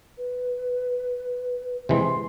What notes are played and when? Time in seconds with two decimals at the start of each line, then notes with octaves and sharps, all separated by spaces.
0.17 B4
1.89 C3 E3 G#3 C6